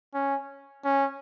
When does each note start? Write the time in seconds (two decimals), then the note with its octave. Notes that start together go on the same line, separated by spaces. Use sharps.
0.14 C#4
0.84 C#4